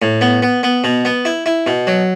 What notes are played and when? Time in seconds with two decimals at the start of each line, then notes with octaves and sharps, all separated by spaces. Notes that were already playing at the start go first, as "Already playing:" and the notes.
0.02 A2
0.21 B3
0.42 B3
0.63 B3
0.84 B2
1.05 B3
1.25 E4
1.46 E4
1.66 B2
1.87 F#3